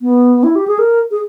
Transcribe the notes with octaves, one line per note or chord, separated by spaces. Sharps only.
B3
E4
G4
G#4
A#4
G#4